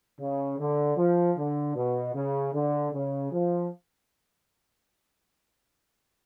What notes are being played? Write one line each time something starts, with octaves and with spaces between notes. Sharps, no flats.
C#3
D3
F3
D3
B2
C#3
D3
C#3
F3